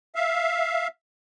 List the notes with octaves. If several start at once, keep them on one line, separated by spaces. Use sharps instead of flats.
E5 F5